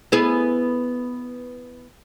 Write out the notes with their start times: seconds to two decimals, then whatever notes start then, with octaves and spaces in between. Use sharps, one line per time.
0.12 B3 E4 G#4